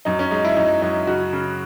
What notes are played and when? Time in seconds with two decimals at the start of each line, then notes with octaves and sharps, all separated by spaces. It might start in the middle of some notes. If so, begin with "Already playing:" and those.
0.05 F#2 D#4
0.19 C#4
0.31 G#3 D#4
0.45 E4
0.57 F#2 D#4
0.82 F#2 D#4
1.07 C#3 F#4
1.33 C#3